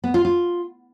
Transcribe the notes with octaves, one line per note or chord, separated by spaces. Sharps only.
B3
F4
F4